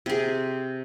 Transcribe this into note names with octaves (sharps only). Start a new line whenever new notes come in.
C3 G#4